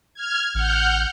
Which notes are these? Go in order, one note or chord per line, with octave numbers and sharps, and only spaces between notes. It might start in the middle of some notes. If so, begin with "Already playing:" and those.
F6 G#6
A1 F#5 F6 G6